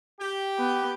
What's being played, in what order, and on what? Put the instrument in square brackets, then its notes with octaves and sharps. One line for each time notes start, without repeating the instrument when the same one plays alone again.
[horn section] G4 G5
[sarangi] B3